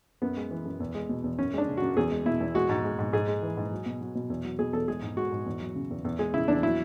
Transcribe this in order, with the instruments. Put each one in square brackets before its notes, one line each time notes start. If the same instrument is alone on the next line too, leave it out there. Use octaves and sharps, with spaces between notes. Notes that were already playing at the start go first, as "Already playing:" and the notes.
[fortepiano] F#2 B3
G#3
E3
F#2
E2
G#3
B2
E2
F#2 C#4
G#3 D4
C#3
F#2 F#4
E2 G#4
G#3
B2 E4
E2
G#3 F#4
G#2
G#3
G#2
G#2 G#4
G#3
E3
G#2
F#3
B2
F#3
B2
E2
F#3
B2 G#4
E2 A4
G#3 G#4
G#2
G#3 F#4
G#2
E2
F#3
C#3
E2
E2
G#3 G#4
C#3 E4
E2 D4
F#3 E4